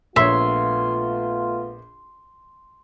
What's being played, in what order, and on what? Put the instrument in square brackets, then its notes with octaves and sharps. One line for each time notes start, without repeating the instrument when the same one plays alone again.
[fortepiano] A#1 C#5 [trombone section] A3 B3 F4 [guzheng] E5 [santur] C6